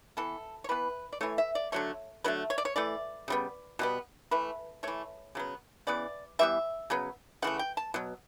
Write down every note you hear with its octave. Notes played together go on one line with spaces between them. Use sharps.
E3 B3 A4
C#5
E3 B3 B4
D5
E3 A3 C#5
E5
D5
D3 F#3 A3 C#5
D3 F#3 A3 B4
C#5
D5
C#5
E3 A3 D5
C#3 G3 B3
B2 G3 B3
E3 A3 B4
E3 A3 C#5
C#3 F#3 B3
C#3 E3 B3 D5
E3 G3 B3 E5
C#3 F#3 B3
C#3 E3 A3 F#5
G5
A5
B2 F#3